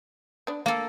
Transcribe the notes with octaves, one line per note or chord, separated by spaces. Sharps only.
B3 D4
A#3 A4 F5